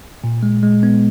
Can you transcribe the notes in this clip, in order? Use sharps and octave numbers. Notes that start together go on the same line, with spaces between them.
A#2
G#3
G#3
B3